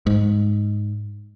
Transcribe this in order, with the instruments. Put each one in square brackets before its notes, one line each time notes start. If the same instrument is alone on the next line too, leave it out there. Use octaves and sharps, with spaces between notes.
[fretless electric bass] G#2